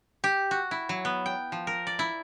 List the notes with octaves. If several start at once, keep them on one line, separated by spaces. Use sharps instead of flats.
G4
F#4
E4
F#3
B3
G5
F3
A#4
D5
E4